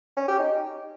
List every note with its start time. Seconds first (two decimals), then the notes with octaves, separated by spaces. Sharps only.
0.17 C#4
0.28 G4
0.39 D#4